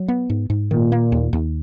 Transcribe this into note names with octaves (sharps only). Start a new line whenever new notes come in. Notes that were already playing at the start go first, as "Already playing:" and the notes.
Already playing: F#3
B3
G#2
G#2
A#2 D#3
A#3
D#2
D#2